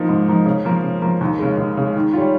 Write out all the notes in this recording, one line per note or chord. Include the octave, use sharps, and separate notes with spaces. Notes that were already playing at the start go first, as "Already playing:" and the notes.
Already playing: F3 A#3 D#4
G#2
F3 A#3 D#4
C#3
F3 A#3
C#3
F3 A#3
D#2
C#3 G#3
D#2
C#3 G#3
D#3
G3 C#4 F4